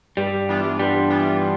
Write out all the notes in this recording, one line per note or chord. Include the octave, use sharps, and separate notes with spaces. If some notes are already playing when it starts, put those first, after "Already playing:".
G2 G3
E3 B3 D4 F4
G2 G3
E3 B3 D4 F4